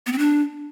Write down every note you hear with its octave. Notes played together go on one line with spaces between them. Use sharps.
B3
C4
D4